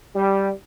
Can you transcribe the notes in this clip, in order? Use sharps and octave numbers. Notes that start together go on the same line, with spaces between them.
G3